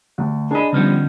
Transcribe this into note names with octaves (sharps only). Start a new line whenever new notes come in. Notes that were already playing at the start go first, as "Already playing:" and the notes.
D2
D4 G#4 D#5 B5
D3 F3 G3 B3 C#4 D#4